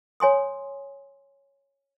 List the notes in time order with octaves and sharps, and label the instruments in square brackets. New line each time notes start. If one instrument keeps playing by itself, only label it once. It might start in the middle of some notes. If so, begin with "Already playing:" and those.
[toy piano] C#5 G#5 C6 D#6